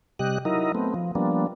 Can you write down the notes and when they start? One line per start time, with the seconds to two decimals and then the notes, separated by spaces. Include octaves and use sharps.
0.19 C3 G3 G4 D#5 F#6
0.45 F#3 D#4 E4 A#4 D#5
0.75 A3 B3 C4
0.94 F3
1.15 F3 G3 A#3 B3 D4